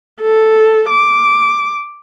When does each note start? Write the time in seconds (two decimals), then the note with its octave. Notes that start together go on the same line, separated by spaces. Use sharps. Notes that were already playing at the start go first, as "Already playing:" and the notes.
0.22 A4
0.90 D6